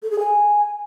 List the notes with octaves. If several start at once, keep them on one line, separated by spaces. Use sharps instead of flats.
A4
G#4
G#5